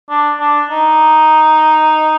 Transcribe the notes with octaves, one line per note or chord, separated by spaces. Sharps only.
D4
D4
D#4